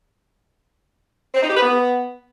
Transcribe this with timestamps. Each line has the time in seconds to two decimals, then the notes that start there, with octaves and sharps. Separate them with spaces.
1.35 C4
1.42 D#4
1.48 G4
1.55 B4
1.62 B3